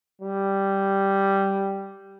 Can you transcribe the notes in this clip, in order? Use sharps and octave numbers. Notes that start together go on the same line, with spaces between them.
G3